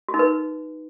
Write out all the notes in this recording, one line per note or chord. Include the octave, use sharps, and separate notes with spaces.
F#4
D#4
B4